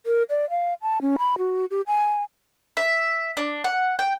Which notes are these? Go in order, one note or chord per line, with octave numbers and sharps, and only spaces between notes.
A#4
D5
F5
A5
C#4
B5
F#4
G4
G#5
E5
D4
F#5
G5